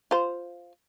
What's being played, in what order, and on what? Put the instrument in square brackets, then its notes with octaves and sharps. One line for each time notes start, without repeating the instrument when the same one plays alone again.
[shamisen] F4 C5